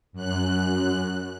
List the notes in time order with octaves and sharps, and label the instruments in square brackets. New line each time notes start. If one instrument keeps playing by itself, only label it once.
[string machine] F#2 F#6